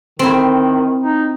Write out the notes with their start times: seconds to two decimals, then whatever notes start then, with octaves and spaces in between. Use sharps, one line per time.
0.19 D#3 C4 E4
1.04 D#4